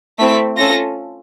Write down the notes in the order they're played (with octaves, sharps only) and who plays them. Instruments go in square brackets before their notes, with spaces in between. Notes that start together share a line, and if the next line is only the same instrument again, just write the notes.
[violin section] A3 C4 E4 B6
C#4 F4 A4 A#6